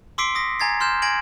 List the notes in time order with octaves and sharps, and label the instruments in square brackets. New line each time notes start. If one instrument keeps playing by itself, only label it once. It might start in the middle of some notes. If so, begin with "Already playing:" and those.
[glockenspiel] C6 D6 E6 B6 C7 D7
D#6 A#6 B6
G#5 A#5 G#6 A6 C7
C6 F6 G6 E7
G#5 G#6 A#6 D7 F#7